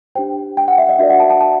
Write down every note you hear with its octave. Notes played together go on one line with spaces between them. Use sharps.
D4 G4 C5 G5
G5
F#5
E5
D#5
D4 F#4 A#4 D5 E5
F#5
A5
A5
A5